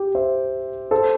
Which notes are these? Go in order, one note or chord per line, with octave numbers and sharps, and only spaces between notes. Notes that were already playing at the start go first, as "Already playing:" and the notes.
Already playing: G4
C5 E5
A4 C5